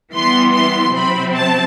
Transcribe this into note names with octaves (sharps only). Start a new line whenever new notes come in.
E3 G3 B3 C6
C6
C3 F#3 C4 B5
A5